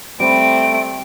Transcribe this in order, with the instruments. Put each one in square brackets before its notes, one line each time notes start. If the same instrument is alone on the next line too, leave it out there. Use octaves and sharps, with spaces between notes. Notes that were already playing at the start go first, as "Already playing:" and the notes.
[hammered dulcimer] G3 [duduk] A3 [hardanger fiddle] C4 [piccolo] D7